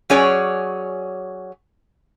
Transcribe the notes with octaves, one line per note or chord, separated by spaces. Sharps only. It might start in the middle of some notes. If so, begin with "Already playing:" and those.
F#3 C#4 G#4 C#5 D5